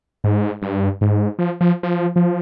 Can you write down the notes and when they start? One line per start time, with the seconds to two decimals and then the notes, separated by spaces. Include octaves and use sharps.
0.24 G#2
0.62 G2
1.01 G#2
1.39 F3
1.61 F3
1.83 F3
2.16 F3